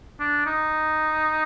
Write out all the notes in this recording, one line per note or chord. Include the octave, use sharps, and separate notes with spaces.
D4
D#4